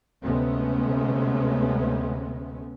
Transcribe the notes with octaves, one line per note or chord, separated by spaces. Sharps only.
D2 C3 G#3 A3 B3 C#4